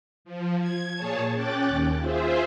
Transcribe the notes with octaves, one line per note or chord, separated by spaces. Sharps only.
F3
G#6
A#2 G#4 C#5 A5
C#4 G5 D6 F#6 A6
D#2
F4 G#4 C5 E5